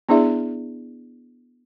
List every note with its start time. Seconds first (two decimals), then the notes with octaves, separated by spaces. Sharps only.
0.09 B3 D4 E4 G#4 D5 E5